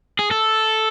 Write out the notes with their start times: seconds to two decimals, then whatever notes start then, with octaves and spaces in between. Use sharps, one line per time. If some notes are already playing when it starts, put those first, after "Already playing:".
0.19 G#4
0.31 A4